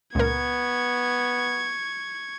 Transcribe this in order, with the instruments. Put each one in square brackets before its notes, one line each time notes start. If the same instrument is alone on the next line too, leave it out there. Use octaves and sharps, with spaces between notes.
[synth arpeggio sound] C#2 A#2 A#4 [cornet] B3 [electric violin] C#6 G#6